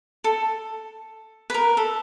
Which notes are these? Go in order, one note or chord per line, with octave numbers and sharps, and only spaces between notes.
A4
B4
A#4
A4